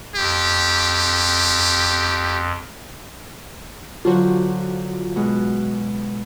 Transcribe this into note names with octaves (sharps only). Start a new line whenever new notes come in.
F2 G4
D3 F#3 F4 F#4 C5
B2 G#3 F#6